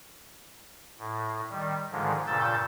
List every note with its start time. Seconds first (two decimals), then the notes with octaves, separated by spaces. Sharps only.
0.99 A2
1.50 D#3 G3
1.91 G#2 D3 D#3 F3 G#3
2.27 G2 A#2 C#3 E6 G6 A6